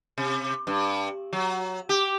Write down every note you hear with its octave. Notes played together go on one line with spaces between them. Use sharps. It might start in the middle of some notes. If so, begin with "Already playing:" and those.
C3
G2
F#3
G4